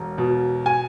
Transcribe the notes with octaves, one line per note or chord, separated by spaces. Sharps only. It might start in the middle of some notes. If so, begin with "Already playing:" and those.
Already playing: E1
B2
G#5